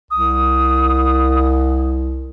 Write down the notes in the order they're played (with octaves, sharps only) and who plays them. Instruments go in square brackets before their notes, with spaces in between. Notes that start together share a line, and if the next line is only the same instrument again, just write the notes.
[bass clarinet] C2 [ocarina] D#6